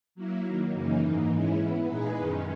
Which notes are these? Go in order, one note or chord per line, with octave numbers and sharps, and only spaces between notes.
F#3 A#3 E4
D#3 F#3 A#3
F#2 C#3 E3 A#3 D#4
G#2 E3 A#3 D#4
E3 G#3 C#4 E4
E3 B3 E4
A#2 G#3 D#4 G#4 B4
F#2 D#3 G#3 C#4